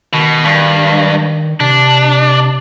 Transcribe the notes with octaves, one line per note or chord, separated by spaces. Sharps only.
B2 D#3
G2
C3 D4